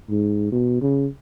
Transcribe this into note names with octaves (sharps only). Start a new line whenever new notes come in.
G#2
B2
C#3